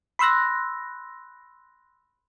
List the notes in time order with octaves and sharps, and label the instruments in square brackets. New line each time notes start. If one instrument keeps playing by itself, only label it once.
[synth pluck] B5 C6 E6 F#6 A#6